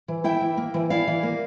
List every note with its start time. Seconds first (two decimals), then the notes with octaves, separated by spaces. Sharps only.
0.08 E3
0.24 E4 E5 G5
0.41 E3
0.57 A#3
0.74 E3
0.90 E4 D5 F5
1.07 E3
1.23 A#3